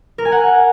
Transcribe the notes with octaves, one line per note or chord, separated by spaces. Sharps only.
A#4
G#5
F#5